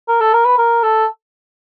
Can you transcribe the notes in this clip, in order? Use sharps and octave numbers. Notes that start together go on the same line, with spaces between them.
A#4
A4
A#4
B4
A#4
A4